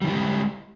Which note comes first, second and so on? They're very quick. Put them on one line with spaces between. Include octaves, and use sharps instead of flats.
G3 D#3 E4 G4 G#3